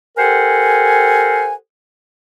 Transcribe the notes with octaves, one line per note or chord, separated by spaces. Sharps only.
G4 A4 A#4 C5 F#5 G#5